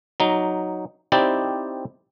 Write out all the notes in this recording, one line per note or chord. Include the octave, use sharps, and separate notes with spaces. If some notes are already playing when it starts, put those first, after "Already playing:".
F#3 D#4
C4 D#4 E4 G4 D5